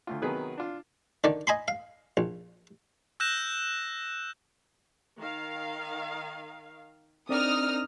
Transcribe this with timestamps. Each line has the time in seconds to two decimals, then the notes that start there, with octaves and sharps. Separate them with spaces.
0.07 D2 A3 F4
0.22 C3 D#3 F#3 B3 G#4 B4
0.58 D4 F4
1.24 D3 D#3 D5
1.47 D#5 G#5 B5 C6
1.68 F5
2.17 A#1
3.20 E6 F#6 G6 A#6 E7
5.18 D#3 F5
7.29 C4 D4 D#4 A#4 D5 D#6 F6